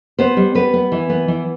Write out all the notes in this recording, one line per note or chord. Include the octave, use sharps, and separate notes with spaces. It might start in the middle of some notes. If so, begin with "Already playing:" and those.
B3 C5
G3
B3 B4
B3
E3
B3
E3